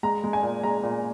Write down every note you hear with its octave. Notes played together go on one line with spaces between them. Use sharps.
G#3 A#5
G#3
G#5
A#2
G#3 A#5
A#2